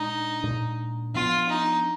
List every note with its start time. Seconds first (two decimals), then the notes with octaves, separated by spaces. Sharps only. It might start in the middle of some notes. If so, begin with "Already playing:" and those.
Already playing: A#2 G#3 D4 D#4
0.43 A#2 G#3 D4
1.14 F3 B3 D4 F4
1.50 D#4